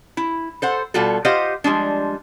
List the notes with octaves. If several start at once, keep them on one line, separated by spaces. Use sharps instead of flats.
E4
A4 C5 F#5
B2 G3 F4 F#4 A4
F4 G4 C5 D#5 F5 F#5
F3 G3 G#3 D4